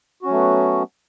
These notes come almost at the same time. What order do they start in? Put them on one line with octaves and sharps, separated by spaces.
F#4 C#4 F#3 A3 B3